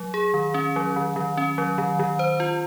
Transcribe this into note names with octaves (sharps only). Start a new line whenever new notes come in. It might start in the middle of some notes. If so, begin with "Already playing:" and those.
Already playing: F#3
G#4
D#3
C#4
F#3
D#3
D#3
C#4
F#3
D#3
D#3
C5
F4